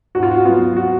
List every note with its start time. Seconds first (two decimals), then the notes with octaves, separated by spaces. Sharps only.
0.15 G#2 F#4
0.23 F4
0.31 F#4
0.45 F#3 B3 F4
0.77 F#4